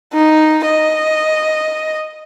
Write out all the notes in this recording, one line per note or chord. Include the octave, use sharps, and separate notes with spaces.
D#4
D#5